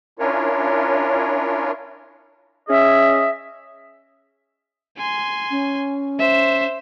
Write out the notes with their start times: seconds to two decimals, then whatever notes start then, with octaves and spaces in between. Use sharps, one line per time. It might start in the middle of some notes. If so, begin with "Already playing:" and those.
0.19 C#4 D4 E4 F4 A#4 C#5
2.68 C#4 G#4 D#5 E5
4.98 G#5 C6
5.51 C#4
6.19 C5 E5